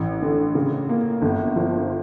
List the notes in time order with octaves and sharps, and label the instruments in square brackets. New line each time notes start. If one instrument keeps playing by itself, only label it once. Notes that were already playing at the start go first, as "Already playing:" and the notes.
Already playing: [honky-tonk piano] A1
D3
C#3
A#3
G1
F3